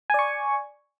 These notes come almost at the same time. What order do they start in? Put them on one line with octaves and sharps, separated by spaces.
G#5 D5 C#6